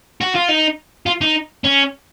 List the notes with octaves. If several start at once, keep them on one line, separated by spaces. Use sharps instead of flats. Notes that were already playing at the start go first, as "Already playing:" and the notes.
F#4
F4
D#4
F4
D#4
C#4